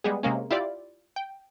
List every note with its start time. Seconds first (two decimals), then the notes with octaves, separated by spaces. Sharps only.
0.04 G3 G#3 B3 G#4
0.23 C3 G#3 A#3 C#4
0.51 E4 F4 G4 D5
1.16 G5